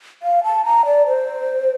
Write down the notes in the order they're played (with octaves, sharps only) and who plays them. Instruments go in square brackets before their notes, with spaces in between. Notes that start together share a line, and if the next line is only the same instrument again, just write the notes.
[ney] F5
A5
A#5
D5
C5